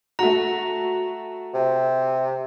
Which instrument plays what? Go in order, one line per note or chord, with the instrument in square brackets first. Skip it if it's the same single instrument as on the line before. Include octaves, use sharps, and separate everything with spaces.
[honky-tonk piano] A3 F#4 [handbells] A#5
[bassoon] C3